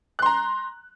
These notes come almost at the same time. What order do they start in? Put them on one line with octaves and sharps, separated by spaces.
F#6 C6 A#5